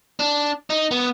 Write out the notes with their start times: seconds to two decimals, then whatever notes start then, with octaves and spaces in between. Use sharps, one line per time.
0.20 D4
0.70 D#4
0.91 B3